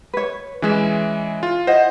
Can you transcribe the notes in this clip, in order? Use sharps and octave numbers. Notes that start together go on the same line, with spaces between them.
B4 C#5
E3 G#3 C#4 E4 E5
F4
E4 C5 D#5 F#5